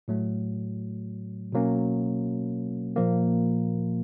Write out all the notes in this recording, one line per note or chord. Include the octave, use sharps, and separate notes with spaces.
A2 F#3 A3
B2 F#3 A#3 C#4
A#2 F3 A#3